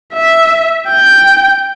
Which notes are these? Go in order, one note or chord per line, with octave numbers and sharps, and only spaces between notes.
E5
G5 G6